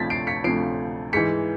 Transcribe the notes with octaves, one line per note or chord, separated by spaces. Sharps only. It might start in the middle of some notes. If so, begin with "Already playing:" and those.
Already playing: D2 C3 F3 A6 B6
C7 D7
B6 C#7
D2 C3 F3 C7 D7
G#2 E3 B6 C#7